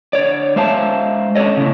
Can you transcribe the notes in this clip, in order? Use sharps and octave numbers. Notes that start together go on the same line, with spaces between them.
D3 C#5 D5
G#3 C5 E5 F5 A5
C#4 D4 A4 C#5 D#5
A2 C#3